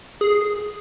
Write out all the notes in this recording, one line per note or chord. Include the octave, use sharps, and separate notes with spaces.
G#4